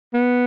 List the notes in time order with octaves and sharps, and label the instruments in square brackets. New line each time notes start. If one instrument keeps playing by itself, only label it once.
[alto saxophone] B3